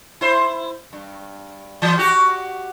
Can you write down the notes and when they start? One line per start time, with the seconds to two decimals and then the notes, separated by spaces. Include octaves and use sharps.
0.21 E4 C5
0.93 G2
1.82 E3
1.98 F#4 G4